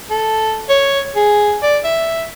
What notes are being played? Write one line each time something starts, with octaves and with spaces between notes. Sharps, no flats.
A4
C#5
G#4
D5
E5